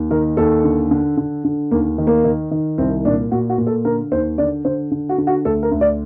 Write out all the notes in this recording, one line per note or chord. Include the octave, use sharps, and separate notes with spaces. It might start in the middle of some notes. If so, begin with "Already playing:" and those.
Already playing: D#2
D#3 A#4
D#2 A4
D3
D3
D3
D3
D#2 A#3
D#3
A#3
D#3
D#3
C2 C4
A#2 D4
A#2 F#4
F#4
A#2
A4
D3 A#4
D#2 C5
D3 D5
D3 C5
D3
F#4
D3
F#4
D2 A4
A#4
D2
D5